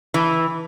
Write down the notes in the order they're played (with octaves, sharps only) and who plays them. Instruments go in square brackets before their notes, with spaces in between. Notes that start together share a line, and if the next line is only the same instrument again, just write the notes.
[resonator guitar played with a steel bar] E3